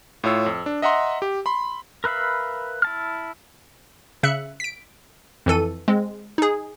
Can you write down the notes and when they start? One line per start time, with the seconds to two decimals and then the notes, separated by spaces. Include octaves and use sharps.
0.24 A2 F4 C#5 E6
0.46 F2
0.66 D4
0.82 D#5 E5 F#5 A#5 C6
1.22 G4
1.46 B5 C6
2.04 A#4 B4 E5 F5 B5
2.82 E4 A5 F6
4.23 C#3 E5 F#6 C#7
4.60 B6 D7
5.46 F2 E3 A4 D#7
5.88 G#3 C4
6.38 D#4 G#4